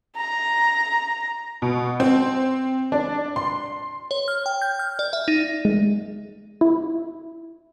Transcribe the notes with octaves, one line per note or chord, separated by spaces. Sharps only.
A#5
B2
C4
D4
C6
C#5
F6
G5
G6
F6
D5
E5
D#4
G#3
E4